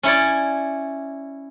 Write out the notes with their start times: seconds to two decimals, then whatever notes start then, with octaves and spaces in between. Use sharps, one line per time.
0.03 C#4 E4 C#5 D5